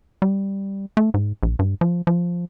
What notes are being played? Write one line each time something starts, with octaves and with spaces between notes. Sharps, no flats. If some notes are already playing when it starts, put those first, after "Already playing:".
G3
A3
G#2
A#1
G2
F3
F3